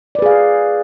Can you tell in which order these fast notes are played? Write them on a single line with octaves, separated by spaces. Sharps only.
D5 B4 G#4 F5